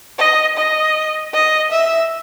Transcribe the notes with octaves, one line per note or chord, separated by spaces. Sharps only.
D#5
D#5
D#5
E5